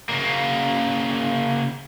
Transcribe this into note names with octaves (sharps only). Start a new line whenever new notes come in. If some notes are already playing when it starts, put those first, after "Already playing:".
C#3 A#3